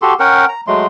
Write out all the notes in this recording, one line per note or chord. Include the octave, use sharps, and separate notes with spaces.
F#4 G4 A4 C6
C#4 A#4 F#5 G5
A#5
F#3 G#3 A3 C6